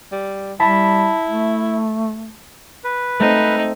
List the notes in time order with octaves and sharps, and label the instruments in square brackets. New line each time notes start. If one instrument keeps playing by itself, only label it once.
[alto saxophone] G3
[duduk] G3 [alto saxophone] E4 [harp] A5 B5
[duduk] A3
[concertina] B4
[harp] A3 C4 A4 [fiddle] D#4